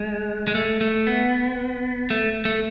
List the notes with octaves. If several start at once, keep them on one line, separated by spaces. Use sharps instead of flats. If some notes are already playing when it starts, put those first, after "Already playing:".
Already playing: G#3
G#3
A3
A3
B3
A3
A3